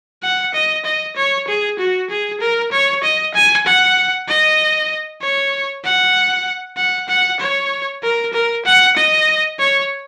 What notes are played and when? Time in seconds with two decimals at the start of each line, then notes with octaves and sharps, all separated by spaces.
0.23 F#5
0.54 D#5
0.85 D#5
1.16 C#5
1.48 G#4
1.79 F#4
2.10 G#4
2.40 A#4
2.72 C#5
3.03 D#5
3.34 G#5
3.66 F#5
4.28 D#5
5.21 C#5
5.84 F#5
6.77 F#5
7.08 F#5
7.40 C#5
8.03 A#4
8.33 A#4
8.65 F#5
8.96 D#5
9.59 C#5